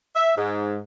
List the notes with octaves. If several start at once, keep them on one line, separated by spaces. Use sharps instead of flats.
E5
G#2